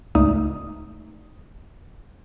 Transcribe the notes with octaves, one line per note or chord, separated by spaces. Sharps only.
C#2 G#2 A3 D#4 D5 D#6